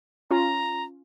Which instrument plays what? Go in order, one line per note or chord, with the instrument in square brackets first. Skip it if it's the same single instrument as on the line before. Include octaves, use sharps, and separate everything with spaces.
[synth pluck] C#4 F4 [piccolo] A#5